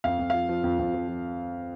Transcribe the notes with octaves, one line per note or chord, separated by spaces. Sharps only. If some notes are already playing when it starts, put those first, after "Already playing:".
F2 F5
F2
F3 F5
F3
F2
F2
F3
F3